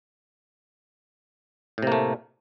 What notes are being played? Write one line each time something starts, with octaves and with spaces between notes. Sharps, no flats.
A2 C3 A3 A#3